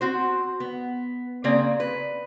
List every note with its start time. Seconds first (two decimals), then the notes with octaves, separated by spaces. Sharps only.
0.01 C4 F#4 C5
0.60 B3
1.44 C#3 A#3 C4 G#4 D5
1.80 B4